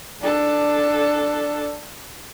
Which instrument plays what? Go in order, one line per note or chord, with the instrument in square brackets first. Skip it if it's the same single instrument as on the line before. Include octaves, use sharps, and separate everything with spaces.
[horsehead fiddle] D4 A4